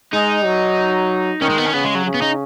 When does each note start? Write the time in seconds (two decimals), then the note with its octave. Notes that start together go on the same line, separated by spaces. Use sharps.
0.13 G#3 D#4
0.45 F#3
1.41 D#3 C#4
1.50 G#3
1.58 B3
1.66 C#4
1.73 C#3 B3
1.84 G#3
1.95 F#3
2.06 C#3
2.14 B3
2.22 D#4